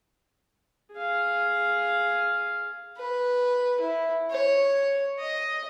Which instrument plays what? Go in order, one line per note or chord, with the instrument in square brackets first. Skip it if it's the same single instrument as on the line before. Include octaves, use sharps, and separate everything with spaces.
[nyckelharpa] G#4 F5
[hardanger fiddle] B4
E4
C#5
D#5